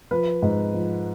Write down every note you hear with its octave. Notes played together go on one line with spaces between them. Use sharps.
F3 B4
G#2
F3